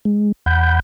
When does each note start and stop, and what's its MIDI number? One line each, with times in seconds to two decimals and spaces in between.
0.05 0.32 56
0.46 0.80 40
0.46 0.80 78
0.46 0.80 83
0.46 0.80 91